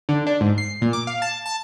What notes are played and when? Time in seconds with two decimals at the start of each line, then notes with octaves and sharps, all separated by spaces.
0.09 D3
0.27 D4
0.41 G#2
0.58 C7
0.82 A#2
0.93 D6
1.07 F5
1.22 A5
1.46 A5